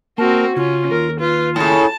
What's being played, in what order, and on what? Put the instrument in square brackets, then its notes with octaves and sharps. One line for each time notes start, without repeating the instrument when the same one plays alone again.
[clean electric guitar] A#3 A5 [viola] C4 F#4 [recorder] A#4
[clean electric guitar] C#3 [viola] C#4 [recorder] F4
[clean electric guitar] D#2 [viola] A#4
[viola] F4 [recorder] B4
[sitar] A2 C#3 [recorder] E4 [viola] A5